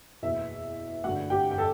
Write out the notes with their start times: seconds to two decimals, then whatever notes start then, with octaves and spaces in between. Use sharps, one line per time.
0.23 F#1 E2 B2 E5
1.04 A1 G2 D3 F#4 F#5
1.30 G4 G5
1.51 G5
1.58 A4 A5